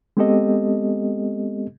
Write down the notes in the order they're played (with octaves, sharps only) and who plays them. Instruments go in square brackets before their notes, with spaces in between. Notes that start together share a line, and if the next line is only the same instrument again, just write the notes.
[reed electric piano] G#3 B3 C4 G4 A4 D#5